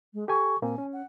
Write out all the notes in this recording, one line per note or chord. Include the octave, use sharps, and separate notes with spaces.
G#3
G4 A4 G#5 C#6
A#2 A#3 C4 G#5
C#4
F#5